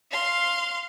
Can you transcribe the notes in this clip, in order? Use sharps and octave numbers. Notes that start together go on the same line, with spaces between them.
F5 C6